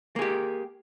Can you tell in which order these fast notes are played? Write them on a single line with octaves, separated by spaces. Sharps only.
A#3 G#4 G4